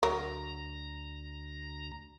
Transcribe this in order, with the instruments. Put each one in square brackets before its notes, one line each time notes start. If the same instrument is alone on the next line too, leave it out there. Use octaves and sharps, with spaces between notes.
[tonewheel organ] D2 A#5 [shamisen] F#3 A#4